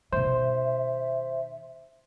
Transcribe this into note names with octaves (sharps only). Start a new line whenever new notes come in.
B2 D#3 C5 E5